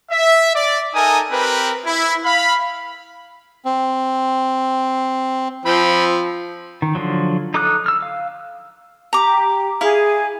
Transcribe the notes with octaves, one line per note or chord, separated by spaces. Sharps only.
E5
D5
D#4 A4 A#4 G#5 D#6
C4 G4 A#4 B4
E4
F5 B5
C4
F3 C4 B5
D#3
D3 F3 F#3
D#4 A4 D6 D#6 F#6
E6 F6
F5
G4 A#5 D6
E4 G#4 F5